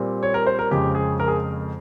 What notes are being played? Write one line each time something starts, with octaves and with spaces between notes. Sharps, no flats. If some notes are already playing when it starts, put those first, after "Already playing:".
Already playing: A#2 G3 C4
C#5
A#4
C5
A#4
F2 C#3 G#3 C4 G4
G#4
A#4
G#4